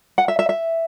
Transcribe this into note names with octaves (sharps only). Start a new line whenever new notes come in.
F#5
E5
E5
E5